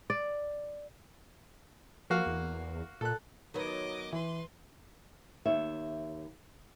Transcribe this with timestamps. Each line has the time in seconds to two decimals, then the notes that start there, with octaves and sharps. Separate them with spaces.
0.10 D5
2.10 F3 A#3 F#4 F5
2.26 E2
3.01 A#2 A4 F#6
3.54 D#3 F#3 B3 D#5 D6
4.13 E3 B4 C6
5.46 D#2 C#5 E5